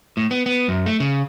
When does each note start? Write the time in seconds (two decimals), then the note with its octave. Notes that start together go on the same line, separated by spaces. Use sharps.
0.17 A2
0.31 B3
0.46 B3
0.68 F#2
0.86 A3
1.00 C#3